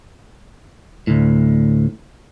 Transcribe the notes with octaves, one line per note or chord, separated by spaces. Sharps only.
D2 A2